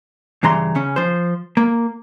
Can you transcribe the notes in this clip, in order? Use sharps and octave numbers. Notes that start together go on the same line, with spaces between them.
G2 C#3 E3 A#5 C6
C#3 C#4
F3 C5
A#3